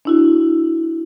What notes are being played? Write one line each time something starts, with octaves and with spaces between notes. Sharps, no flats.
D4 E4 F#4